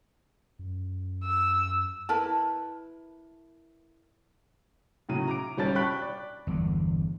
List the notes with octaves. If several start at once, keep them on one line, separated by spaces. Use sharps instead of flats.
F#2
E6
E4 A#4 B4 A5
A2 C#3 F#3 D#7
A#5 D6 D7
G1 G3 C#4 A5 A6
G5 B5 C#6 F#6 B6
D5
G1 E2 D3